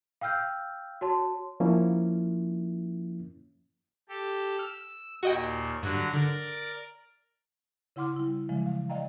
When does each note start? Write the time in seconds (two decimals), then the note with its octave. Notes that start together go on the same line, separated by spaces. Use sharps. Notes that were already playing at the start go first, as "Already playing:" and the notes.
0.21 F5 G5 E6 F6 G6
1.01 F#4 C#5 A5 C6
1.60 F3 A#3 C#4 E4
4.09 G4 A4
4.59 E6 F6
5.23 D#2 A#2 F#4 D#5 G5
5.83 G2 D3 F#3 F#4
6.13 D3 A#4 D5
7.96 C#3 E4 F#5 C6 D6 F6
8.16 G3 E4
8.49 C#3 E3 F3 G#3
8.66 F5
8.89 D5 D#5 F5 G5 A#5